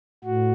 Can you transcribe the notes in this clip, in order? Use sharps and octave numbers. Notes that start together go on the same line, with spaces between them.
A2 F#4